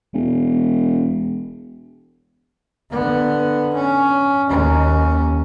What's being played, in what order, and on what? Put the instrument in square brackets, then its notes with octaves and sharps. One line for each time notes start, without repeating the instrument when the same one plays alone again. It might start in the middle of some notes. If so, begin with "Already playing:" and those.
[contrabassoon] E1
[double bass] D3 B3
C#4
D#2 C#4